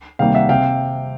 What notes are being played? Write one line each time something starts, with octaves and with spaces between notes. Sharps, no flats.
C3 D#3 G3 A#3 F5 G5
E5 F#5
C3 F5 G5